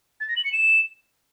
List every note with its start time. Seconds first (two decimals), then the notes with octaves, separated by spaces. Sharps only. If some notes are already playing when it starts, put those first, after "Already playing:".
0.20 A6
0.28 A#6
0.36 F#7
0.44 C#7
0.52 E7